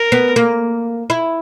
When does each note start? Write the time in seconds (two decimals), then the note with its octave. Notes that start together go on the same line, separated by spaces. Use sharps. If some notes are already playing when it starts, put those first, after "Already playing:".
Already playing: A#4
0.12 B3
0.36 A#3
1.10 E4